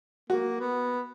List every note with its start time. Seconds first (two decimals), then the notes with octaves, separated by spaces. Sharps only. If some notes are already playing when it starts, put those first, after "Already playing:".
0.30 A#3 F#4
0.60 B3